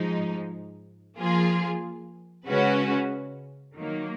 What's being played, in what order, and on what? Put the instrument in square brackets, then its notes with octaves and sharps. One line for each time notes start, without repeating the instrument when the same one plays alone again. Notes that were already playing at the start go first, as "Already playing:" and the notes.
Already playing: [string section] G#2 F3 G#3 D#4
F3 A#3 F4 G#4
C#3 G#3 C#4 F#4 B4
D#3 F#3 A#3